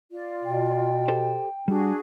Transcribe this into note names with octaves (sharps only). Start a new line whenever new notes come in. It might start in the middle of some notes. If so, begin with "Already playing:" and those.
F4 D5
B2 G5
G4 A4 C5
G3 D4 F#4 G#4